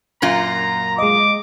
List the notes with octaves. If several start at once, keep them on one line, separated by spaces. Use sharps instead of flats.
F#2 A#2 F4 A#5
G#3 D#5 D6